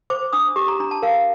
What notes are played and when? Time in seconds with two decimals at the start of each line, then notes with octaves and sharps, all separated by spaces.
0.10 C5 D6
0.33 D4 D#6
0.56 G4 D6
0.68 A#5
0.80 D4 A#5
0.91 A5
1.02 A#4 F5